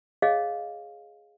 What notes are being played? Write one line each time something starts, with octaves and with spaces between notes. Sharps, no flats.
G#4 C#5 D#5 F5